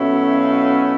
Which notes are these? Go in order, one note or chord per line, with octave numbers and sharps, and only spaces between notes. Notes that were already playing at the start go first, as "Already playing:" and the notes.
Already playing: B2 F#3 A3 C#4 E4
F5